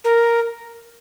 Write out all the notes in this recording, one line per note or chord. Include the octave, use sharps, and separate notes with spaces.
A#4